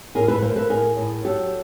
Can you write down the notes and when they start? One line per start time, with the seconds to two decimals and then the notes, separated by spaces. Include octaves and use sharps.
0.15 A2 G#4 A#4
0.28 A4 B4
0.42 A#3 A#4 C5
0.56 A4 B4
0.70 A2 G#4 A#4
0.97 A2
1.24 F#3 G4 A4